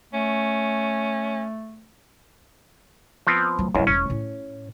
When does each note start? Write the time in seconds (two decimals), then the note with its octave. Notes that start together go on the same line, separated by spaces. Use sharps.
0.13 A3 C#4
3.27 F3 B3 C4
3.59 F#3 A3
3.75 C#2 F#2 G3 E4
3.87 E1 C#4
4.10 A2